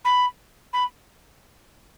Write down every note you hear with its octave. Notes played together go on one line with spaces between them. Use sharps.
B5
B5